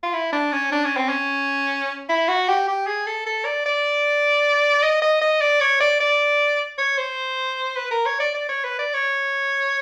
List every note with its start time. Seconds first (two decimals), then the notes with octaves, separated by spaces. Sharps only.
0.03 F4
0.13 E4
0.32 D4
0.52 C#4
0.72 D4
0.84 C#4
0.97 C4
1.09 C#4
2.09 E4
2.28 F#4
2.48 G4
2.68 G4
2.87 G#4
3.07 A4
3.26 A4
3.45 D5
3.66 D5
4.83 D#5
5.02 D#5
5.21 D#5
5.41 D5
5.60 C#5
5.80 D5
6.00 D5
6.78 C#5
6.97 C5
7.76 B4
7.91 A#4
8.05 C#5
8.20 D5
8.34 D5
8.49 C#5
8.64 B4
8.79 D5
8.94 C#5